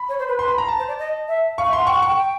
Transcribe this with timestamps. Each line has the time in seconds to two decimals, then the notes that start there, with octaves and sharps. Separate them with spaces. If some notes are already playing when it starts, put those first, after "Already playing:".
Already playing: B5
0.09 C#5
0.19 C5
0.28 B4
0.39 B4 C6
0.48 B5
0.58 A#5
0.68 A5
0.78 C5
0.88 D5
0.99 D#5
1.28 E5
1.58 F5 C#6
1.67 E5
1.73 F#5 C6
1.87 G5 C#6
1.97 F#5
2.02 G5 C#6
2.17 G5